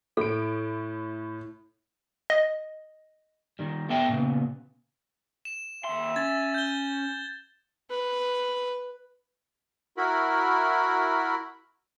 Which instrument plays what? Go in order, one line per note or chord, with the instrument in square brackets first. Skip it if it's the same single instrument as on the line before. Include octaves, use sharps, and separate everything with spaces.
[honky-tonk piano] A2 D7 [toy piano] A4
[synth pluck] D#5
[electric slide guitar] D#3 G3
A3 B3 A4 E5 G5
A#2 C#3 B3
[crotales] E7
[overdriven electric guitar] D#2 C6 [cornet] E5
[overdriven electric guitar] C#4 [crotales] G#6 A6
[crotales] G6 G7
[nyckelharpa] B4
[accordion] E4 F#4 A#4 B5